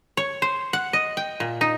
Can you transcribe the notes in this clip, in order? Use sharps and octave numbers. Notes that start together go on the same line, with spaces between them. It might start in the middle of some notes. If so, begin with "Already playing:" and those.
C#5
C5
F#5
D#5
G5
A#2
D#4